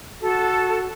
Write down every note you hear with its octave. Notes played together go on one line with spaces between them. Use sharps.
F#4 A4